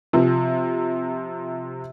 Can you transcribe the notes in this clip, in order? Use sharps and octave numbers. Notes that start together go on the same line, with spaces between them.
C3 F3